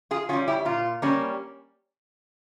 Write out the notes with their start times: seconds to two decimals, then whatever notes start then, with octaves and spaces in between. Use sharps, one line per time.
0.11 F4 G#4
0.29 C#4 F4
0.33 G3
0.48 E4 G4
0.65 A#2 F4
1.02 G3 A#3 C#4